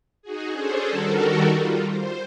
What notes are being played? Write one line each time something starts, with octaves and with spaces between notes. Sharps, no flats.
D#4 F#4 G#4
C#4 D4 G#4 A4 C5
D#3 G3 F#4 A4 A#4
G3 F4
C5